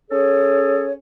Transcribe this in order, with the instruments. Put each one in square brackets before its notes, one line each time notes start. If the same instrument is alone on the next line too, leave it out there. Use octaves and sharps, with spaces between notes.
[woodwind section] C#4 G#4 A4 C#5